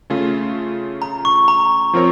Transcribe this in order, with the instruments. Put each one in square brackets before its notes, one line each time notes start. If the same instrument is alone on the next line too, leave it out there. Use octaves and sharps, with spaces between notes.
[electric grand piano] C#3 A3 C#4 F4
[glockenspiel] A#5
C#6
A#5
[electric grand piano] F3 C4 F4 A#4 C#5